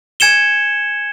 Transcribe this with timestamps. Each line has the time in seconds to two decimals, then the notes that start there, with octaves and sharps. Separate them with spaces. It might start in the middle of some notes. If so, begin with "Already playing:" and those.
0.20 G#5 G#6 C#7 E7 G7